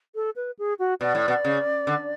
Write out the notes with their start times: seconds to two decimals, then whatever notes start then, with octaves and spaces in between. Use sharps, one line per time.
0.15 A4
0.36 B4
0.59 G#4
0.79 F#4
1.01 B2 D5
1.15 A2
1.28 B2
1.45 C#3
1.87 D3